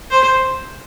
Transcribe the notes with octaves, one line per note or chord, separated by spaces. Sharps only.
C5